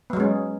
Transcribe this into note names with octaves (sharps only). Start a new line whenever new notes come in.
F#3 G#3 B3 C#4